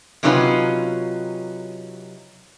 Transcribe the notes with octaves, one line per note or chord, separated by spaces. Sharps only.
C3 F#3 C#4 D#4 F4 B4